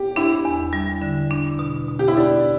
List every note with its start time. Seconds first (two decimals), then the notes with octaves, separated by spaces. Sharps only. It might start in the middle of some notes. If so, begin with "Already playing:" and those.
Already playing: G4
0.16 D4 E4
0.45 E2
0.73 G3
1.02 D3
1.31 D4
1.59 B2
1.88 B2
1.99 G4
2.08 E4
2.16 B2 D4